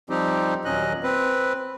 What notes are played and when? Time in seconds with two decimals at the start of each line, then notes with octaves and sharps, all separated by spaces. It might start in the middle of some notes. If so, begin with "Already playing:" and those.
0.10 F3 G3 C4 D#4 G4
0.65 D#2 A#2 F#3 C#4 D#5 F#6
1.03 C4 B4